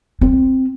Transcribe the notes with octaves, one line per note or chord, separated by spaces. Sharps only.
C4